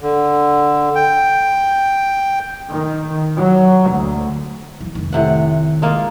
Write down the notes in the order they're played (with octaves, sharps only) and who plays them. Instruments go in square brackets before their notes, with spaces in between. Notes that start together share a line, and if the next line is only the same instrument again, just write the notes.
[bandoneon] D3
G5
[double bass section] D#3
F#3
D2
[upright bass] D#3 E3
F1 D#3
[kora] A2 C3 F#5
G#3 A#3 F4